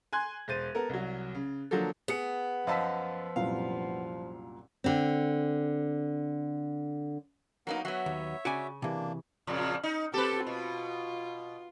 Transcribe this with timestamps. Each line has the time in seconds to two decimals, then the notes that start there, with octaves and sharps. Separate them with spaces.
0.13 G#5 C6 F#6 G#6
0.48 E1 C5 A6 D#7
0.75 B3 A4 A#4
0.89 C2 F#3
1.35 C#3
1.71 D3 F3 F#3 A#3 A4
2.08 B3 G#4 C#7
2.67 F#2 F3 D#5 F5 A5 E6 B6
3.36 C2 F#2 A#2 F5
4.84 D3 C4
7.67 F#3 A#3 B3 D#4 A#4
7.85 F#3 B3 C#5 E5
8.06 D#2
8.45 C#3 F#4 D5 G#5
8.82 C3 E3 A#3 D4
9.47 F2 A#2 C#3
9.83 D#4
10.13 C4 G4 A4 B4
10.47 B2 F4